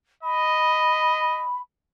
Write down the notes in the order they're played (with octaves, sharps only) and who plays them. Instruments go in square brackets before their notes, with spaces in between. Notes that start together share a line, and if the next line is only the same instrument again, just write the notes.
[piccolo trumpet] D#5 [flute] B5